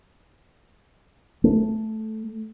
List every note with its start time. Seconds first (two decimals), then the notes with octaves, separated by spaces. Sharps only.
1.44 A3